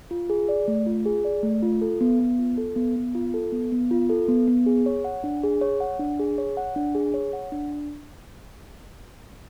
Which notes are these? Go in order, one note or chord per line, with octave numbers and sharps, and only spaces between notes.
F4
G#4
D5
A3
F4
G#4
D5
A3
F4
A4
B3
B3
F4
A4
B3
B3
F4
A4
B3
B3
F4
A4
B3
B3
G#4
C#5
F#5
D4
G#4
C#5
F#5
D4
G#4
C#5
F#5
D4
G#4
C#5
F#5
D4